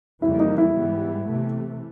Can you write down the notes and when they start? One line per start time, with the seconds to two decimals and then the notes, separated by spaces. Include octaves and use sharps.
0.22 F2 C#3 E3 G3 A#3 E4
0.40 D#4
0.58 E4
0.74 G#2 E3 G3 B3
1.28 C3 E3 A3